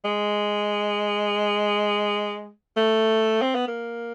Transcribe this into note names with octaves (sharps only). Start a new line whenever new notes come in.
G#3
A3
C4
B3
A#3